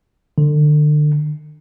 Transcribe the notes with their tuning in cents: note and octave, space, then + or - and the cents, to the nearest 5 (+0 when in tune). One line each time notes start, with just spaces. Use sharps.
D3 +30